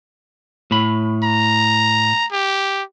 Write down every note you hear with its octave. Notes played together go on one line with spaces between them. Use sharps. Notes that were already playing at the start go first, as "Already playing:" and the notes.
A2 B5
A#5
G4